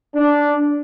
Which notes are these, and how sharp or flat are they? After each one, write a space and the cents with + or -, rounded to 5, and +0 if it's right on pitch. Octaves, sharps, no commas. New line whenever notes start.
D4 -10